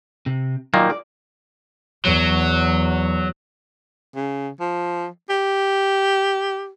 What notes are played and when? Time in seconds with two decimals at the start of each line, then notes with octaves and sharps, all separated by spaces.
0.26 C3
0.74 A#2 D#3 F#3 A#3 D#4
0.90 D5
2.05 E2 F#3
4.15 C#3
4.60 F3
5.29 G4